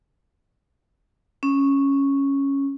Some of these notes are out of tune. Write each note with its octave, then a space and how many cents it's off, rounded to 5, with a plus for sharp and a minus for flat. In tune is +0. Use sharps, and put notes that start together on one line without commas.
C#4 -5